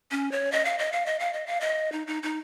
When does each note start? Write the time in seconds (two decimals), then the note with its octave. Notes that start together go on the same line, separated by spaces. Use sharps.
0.11 C#4
0.32 C#5
0.52 D#5
0.65 F5
0.79 D#5
0.92 F5
1.06 D#5
1.19 F5
1.33 D#5
1.47 F5
1.61 D#5
1.92 D#4
2.07 D#4
2.23 D#4